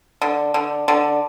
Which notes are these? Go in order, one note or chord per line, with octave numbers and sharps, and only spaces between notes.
D3
D3
D3